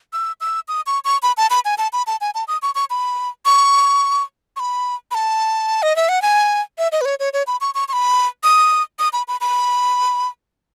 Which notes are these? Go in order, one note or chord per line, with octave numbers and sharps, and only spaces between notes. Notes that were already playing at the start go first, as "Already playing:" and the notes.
E6
E6
D#6
C#6
C#6
B5
A5
B5
G#5
A5
B5
A5
G#5
A5
D#6
C#6
C#6
B5
C#6
C#6
B5
B5
A5
D#5
E5
F#5
G#5
E5
D#5
B4
C#5
C#5
C#5
B5
C#6
C#6
C#6
B5
D#6
D#6
B5
B5
B5